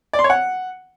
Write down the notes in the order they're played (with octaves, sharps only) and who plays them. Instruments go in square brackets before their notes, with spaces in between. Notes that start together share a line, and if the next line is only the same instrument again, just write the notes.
[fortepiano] D5
C6
C#5
F#5